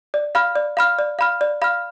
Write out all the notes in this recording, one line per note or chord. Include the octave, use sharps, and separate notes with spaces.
D5
F5 B5 F6
D5
F5 B5 F6
D5
F5 B5 F6
D5
F5 B5 F6